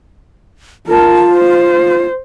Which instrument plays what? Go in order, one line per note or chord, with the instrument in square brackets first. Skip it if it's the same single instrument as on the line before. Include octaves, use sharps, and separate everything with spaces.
[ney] F4 [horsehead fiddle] A#4 A5
[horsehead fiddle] C5